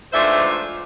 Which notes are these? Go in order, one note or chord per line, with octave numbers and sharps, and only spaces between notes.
G#2 E3 A3 D4 F4 C5 E5